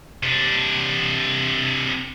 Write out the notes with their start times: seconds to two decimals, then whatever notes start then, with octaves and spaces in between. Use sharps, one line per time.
0.23 C3 D4